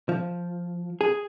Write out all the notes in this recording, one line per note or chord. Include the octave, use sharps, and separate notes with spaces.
F3
G#4